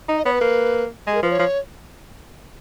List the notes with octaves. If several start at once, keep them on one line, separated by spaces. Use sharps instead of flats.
D#4
D#5
B3 C#5
B4
A#3
G#3 G#4
A#4
F3 B4
C#5
F3